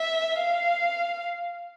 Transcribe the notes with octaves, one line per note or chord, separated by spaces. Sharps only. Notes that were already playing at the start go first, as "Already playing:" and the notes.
Already playing: E5
F5